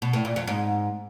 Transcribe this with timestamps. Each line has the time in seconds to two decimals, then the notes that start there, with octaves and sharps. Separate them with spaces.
0.02 B2
0.13 A2
0.25 A#2
0.36 F2
0.47 G#2